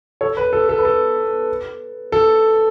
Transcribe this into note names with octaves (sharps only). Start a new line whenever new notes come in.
A4 C#5
B4
A4
A4
B4
A4
A4